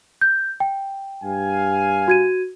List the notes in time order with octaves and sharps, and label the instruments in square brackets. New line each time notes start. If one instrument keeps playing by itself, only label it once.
[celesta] G6
G5
[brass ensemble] G2 F5 G#5
[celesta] F#4 G#6 D#7